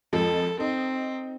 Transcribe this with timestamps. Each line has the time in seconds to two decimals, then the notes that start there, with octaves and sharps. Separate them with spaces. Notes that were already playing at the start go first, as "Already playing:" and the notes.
0.13 F2 F3 G#3 A4
0.60 C4 D#4